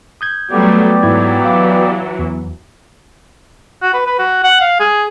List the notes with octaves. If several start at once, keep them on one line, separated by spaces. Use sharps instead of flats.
D#6 G6 G#6
F#3 G3 A3 B3 G4 D5
G#2 E3 F#3 E4 G#6
F5 F#5 D6
E2
F#4
B4
B4
F#4
F#5
F5
G#4